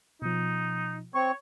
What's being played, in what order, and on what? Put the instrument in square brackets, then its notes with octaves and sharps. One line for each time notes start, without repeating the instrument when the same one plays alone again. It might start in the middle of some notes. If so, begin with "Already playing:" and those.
[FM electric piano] B2 F3 [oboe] D#4
[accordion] C4 C#6 [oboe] C#5